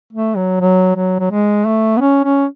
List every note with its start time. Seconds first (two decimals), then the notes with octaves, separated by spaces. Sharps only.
0.13 A3
0.37 F#3
0.61 F#3
0.96 F#3
1.19 F#3
1.31 G#3
1.66 A3
1.97 B3
2.01 C#4
2.25 C#4